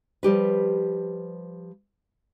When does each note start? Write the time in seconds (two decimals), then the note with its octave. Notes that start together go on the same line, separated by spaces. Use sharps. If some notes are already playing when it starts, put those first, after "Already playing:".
0.23 F3 G3 G4 B4